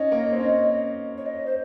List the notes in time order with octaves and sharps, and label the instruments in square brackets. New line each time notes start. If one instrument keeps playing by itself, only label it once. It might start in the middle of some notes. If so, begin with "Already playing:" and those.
Already playing: [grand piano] C#4 D#4 [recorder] D#5
[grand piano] A#3
C4
C#4
[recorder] C#5
D#5
C5